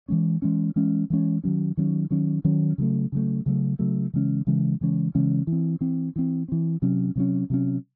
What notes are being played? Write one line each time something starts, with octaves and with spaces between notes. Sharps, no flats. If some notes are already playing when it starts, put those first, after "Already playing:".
E3 G#3 C#4
E3 G#3 C#4
E3 G#3 C#4
E3 G#3 C#4
D#3 F#3 C#4
D#3 F#3 C#4
D#3 F#3 C#4
D#3 F#3 C#4
C#3 F#3 A3
C#3 F#3 A3
C#3 F#3 A3
C#3 F#3 A3
C#3 E3 G#3 C#4
C#3 E3 G#3 C#4
C#3 E3 G#3 C#4
C#3 E3 G#3 C#4
E3
C4
E3 C4
E3 C4
E3 C4
C3 F#3 C#4
C3 F#3 C#4
C3 F#3 C#4